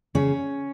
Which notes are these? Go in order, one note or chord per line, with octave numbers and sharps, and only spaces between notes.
C#3 C#4